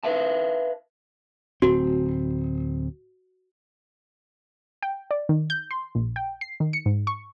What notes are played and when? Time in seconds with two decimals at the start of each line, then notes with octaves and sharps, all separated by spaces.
0.04 B4 E5 F5 A5
1.62 D1 C4 F#4
4.83 G5
5.11 D5
5.29 D#3
5.50 G6
5.71 C6
5.95 A#1
6.16 G5
6.41 C7
6.60 D#3
6.73 C#7
6.86 G#2
7.07 C#6